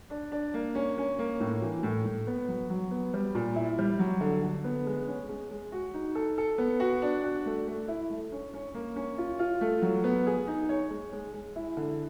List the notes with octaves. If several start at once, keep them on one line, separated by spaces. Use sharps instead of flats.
D4
D4
A#3
C#4
C#4
A#3
A2
E3
A2
A2
B3
F#3
F#3
B3
G3
A#2
E4
G3
F#3
D3
D3
B3
G#3
C#4
G#3
G#3
F#4
D#4
A4
A4
B3
F#4
D4
F#4
A3
A3
E4
A3
C#4
C#4
A#3
C#4
F4
F4
A3
F#3
B3
G#4
D#4
C#5
G#3
G#3
G#3
E4
D3